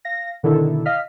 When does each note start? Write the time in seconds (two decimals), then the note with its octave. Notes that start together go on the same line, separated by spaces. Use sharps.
0.05 F5 A#6
0.43 B2 D3 D#3 D4 E4 A4
0.85 D#5 F5 F6 B6